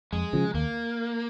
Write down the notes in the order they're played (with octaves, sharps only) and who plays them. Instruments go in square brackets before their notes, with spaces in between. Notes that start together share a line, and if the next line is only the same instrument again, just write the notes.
[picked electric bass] F2 [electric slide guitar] G#3
[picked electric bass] C#3 F3
[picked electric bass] D#2 [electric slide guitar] A#3